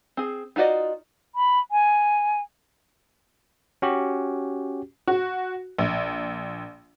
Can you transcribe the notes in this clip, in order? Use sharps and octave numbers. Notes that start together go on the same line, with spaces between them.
C4 G#4
D#4 F4 F#4 D5 D#5
B5
G#5
C#4 F#4 G4
F#4
A#1